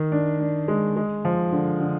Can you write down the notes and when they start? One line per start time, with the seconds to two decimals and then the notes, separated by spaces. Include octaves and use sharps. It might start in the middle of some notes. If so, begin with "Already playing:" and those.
Already playing: D#3
0.12 D4
0.40 D4
0.68 G#3
0.96 G#3
1.25 F3
1.52 D3
1.81 D3